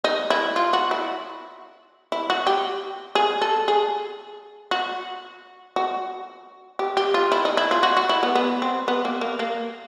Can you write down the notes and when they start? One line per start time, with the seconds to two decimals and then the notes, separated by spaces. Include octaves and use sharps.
0.04 D#4
0.30 E4
0.56 F4
0.73 F#4
0.91 E4
2.12 E4
2.30 F#4
2.47 G4
3.15 G#4
3.41 A4
3.68 G#4
4.71 F#4
5.76 F#4
6.79 G4
6.97 G4
7.14 F4
7.32 E4
7.45 D#4
7.57 E4
7.71 F4
7.83 F#4
7.97 F#4
8.09 E4
8.23 B3
8.35 B3
8.62 C4
8.88 B3
9.05 A#3
9.21 A#3
9.39 A#3